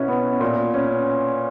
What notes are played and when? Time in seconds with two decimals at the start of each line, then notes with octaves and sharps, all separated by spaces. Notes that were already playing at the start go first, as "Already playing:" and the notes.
Already playing: B2 C#4 E4 F#4
0.08 B3
0.41 A#2
0.74 C#4